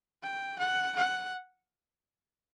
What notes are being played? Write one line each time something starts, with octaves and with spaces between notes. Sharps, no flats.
G5
F#5
F#5